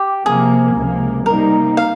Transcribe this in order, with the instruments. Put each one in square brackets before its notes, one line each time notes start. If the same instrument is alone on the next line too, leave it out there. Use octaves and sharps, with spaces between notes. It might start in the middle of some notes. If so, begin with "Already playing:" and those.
Already playing: [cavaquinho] G4
[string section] C3 F3 A#3 [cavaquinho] G#4
[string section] C#2 C3 F3 A#3
[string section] C3 G3 A#3 D#4 [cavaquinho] A#4
[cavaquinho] F5